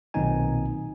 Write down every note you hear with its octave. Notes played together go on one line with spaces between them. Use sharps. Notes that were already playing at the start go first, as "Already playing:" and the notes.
B1 A#2 D#3 C4 D#4 G#5